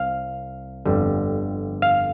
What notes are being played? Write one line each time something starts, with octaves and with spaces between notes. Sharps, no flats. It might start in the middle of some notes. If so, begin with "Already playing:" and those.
Already playing: C2 F5
G1 F2 D3 G3
F5